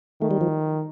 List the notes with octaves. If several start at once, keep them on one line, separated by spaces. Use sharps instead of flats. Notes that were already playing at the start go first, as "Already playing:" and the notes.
D#3 A3
G3
F3